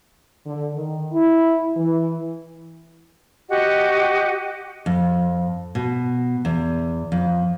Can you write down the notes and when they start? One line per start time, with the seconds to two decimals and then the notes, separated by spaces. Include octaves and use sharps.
0.45 D3
0.75 D#3
1.12 E4
1.77 E3
3.49 F#4 G4 D#5 F#5
4.86 F2
5.75 B2
6.45 E2
7.12 F2